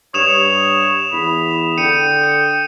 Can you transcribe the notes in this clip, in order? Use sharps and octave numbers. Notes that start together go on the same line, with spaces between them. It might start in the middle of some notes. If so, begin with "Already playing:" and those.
G2 C#5 D#6 E7 F7
E2 B5
D3 G5 C#7 D#7
C#7